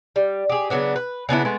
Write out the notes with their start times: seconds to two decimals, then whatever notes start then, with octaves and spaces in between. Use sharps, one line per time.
0.16 G3
0.49 G4 G#4
0.70 C#3 F#3 B3 D4
0.96 B4
1.29 C#3 B3 D4 E4
1.45 G#3 A3 B3